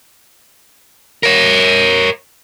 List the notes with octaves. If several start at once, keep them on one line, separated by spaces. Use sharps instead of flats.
A#4 C#5